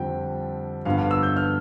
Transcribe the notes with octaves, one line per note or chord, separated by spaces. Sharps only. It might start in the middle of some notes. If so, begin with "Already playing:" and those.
Already playing: F2 D3 G3 C4 G5
G2 D3 F3 B3 F5
F5
E6
G6
F6